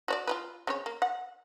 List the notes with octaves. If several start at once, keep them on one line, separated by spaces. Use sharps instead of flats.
F#4 C#5 D5
F4 G4 B4
C#3 C4 C#5
A#3
F#5